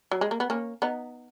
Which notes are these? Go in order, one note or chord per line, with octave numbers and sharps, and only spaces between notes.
F#3
G#3
A#3
B3
A#3 C#4
B3 D#4